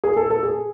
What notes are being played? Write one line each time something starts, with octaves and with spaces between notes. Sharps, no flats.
G#4
A4
A4
G#4